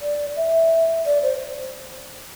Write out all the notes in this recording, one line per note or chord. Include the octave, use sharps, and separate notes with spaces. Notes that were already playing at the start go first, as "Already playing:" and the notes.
D5
E5
D5
C5